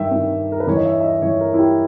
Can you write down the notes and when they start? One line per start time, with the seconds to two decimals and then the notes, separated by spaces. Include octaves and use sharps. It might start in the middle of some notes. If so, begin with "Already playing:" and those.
Already playing: G2 D#3 E5 G5
0.11 G2 D#3
0.52 A#4
0.60 B4
0.67 G2 E3 C#5
0.77 D#5
0.85 E5
1.00 E5
1.04 D#5
1.22 G2 E3 C#5
1.40 A#4
1.54 E4
1.59 G4